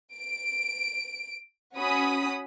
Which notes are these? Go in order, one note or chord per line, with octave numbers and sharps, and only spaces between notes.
D7
C#4 F#4 B5 D#6